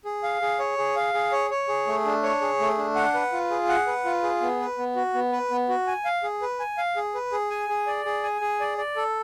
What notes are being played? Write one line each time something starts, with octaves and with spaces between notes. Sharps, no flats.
G#4
F5
G#4
C#5
G#4
F5
G#4
C#5
C#5
G#4
A3
D4
C#5
G#4
A3
D4
F#5
B4
F4
G#4
F#5
B4
F4
G#4
B3
B4
B3
F#4
B3
B4
B3
F#4
G#5
F5
G#4
B4
G#5
F5
G#4
B4
G#4
G#5
G#4
D5
G#4
G#5
G#4
D5
D5
A4